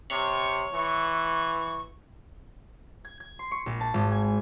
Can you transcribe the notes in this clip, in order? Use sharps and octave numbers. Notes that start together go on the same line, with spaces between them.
C3 C#5
E3 C#6
G#6
G#6
C6
C#6
A#1
A5
G#1
G#5
G#5